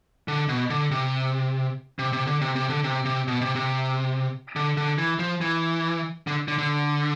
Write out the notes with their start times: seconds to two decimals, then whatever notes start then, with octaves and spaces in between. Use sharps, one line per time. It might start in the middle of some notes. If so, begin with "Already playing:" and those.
0.28 D3
0.49 B2
0.70 D3
0.91 C3
1.99 C3
2.13 C3
2.27 D3
2.41 C3
2.56 C3
2.70 D3
2.84 C3
3.05 C3
3.28 B2
3.41 C3
3.55 C3
4.56 D3
4.77 D3
4.98 E3
5.19 F3
5.41 E3
6.27 D3
6.48 D3
6.58 D3